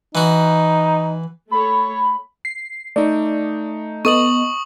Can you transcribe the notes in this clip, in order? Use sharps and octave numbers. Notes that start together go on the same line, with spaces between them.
E3 D#4 F#4
A3 A4 C#5 B5
C7
A3 D#4 D5
B3 A4 D#5 C#6 D#6 D#7 F#7